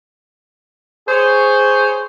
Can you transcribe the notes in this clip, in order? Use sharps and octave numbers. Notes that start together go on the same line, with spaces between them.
G#4 C5 C#5